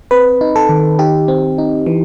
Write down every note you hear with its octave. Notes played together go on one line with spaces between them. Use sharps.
C4 B4
D#4
A4
D#3
D#4 G4
C4
D#4
E3